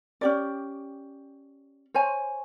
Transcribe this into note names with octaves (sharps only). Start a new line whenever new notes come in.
C#4 G4 D5
C5 C#5 G#5